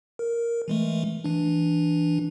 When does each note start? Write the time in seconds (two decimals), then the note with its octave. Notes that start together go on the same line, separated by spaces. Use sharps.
0.19 A#4
0.68 E3 G#3 A3
1.24 E3 D4